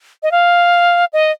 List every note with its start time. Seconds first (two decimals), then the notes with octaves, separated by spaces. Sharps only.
0.23 D#5
0.31 F5
1.13 D#5